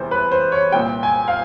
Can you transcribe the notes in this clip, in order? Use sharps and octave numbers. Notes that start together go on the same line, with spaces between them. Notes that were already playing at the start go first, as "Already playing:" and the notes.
Already playing: E2 C3 E3 G3 C5
B4
C5
C#5
C2 A#2 G3 G5
G#5
F5